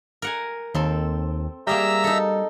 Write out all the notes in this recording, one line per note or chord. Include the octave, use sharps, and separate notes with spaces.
A#4 F#5 G#5
D#2 C4 A4 C6
G3 A#3 G#4 E5 G5 A#5 E6
D#4 A4